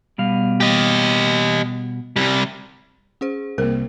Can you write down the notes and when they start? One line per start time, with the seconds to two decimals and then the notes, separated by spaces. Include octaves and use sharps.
0.18 B2 G3 F5
0.60 G4 D#5
2.16 C3 G3
3.21 C#4 G#4 C5
3.58 C2 A#3 A#4 C5